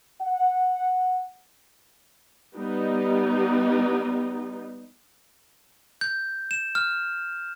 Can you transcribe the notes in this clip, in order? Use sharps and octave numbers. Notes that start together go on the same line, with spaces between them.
F#5
G3 B3 D#4
G6
E7
F6